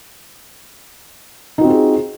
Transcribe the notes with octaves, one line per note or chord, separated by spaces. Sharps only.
C4 D#4 F4 F#4 G#4